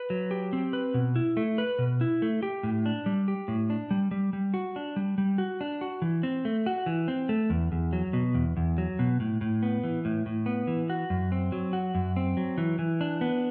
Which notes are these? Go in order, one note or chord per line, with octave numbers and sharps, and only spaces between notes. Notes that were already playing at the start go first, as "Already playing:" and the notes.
Already playing: B4
F#3
G4
C4
B4
B2
E4
A3
B4
B2
E4
A3
G4
A2
D4
G3
G4
A2
D4
G3
G3
G3
F#4
D4
G3
G3
F#4
D4
F#4
E3
C4
A3
F#4
E3
C4
A3
E2
E2
F#3
B2
E2
E2
F#3
B2
A2
A2
B3
E3
A2
A2
B3
E3
F#4
F#2
C4
F#3
F#4
F#2
C4
F#3
E3
E3
D4
B3